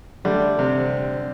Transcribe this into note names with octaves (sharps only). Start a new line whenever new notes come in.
D3 G3 A3
C3 C4